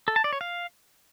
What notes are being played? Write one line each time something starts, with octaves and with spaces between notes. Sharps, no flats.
A4
A5
D5
C#5
F5